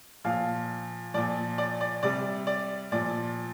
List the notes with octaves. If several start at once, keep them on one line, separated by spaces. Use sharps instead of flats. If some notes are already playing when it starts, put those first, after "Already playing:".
A#2 F3 F5
A#2 F3 D5
D5
D5
C3 G3 D5
D5
A#2 F3 D5